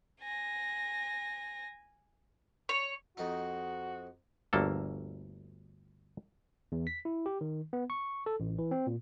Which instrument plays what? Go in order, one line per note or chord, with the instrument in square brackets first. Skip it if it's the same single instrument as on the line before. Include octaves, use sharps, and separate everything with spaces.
[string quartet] G#5 A#6
[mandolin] C#5
[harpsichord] F2 D#4 [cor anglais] F#4
[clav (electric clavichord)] G1 D2 A#3 A4
[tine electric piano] E2
B6
E4
G4
D#3
B3
C#6
A4
A1
E3
C4
A#2